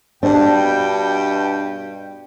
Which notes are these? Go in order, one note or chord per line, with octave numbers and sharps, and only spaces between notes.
G2 B2 D4 G5